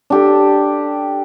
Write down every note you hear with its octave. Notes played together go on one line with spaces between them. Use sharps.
D4 G4 A4